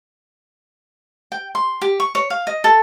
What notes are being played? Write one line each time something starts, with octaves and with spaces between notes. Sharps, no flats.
G5
C6
G4
C#6
C#5
F5
D#5
A4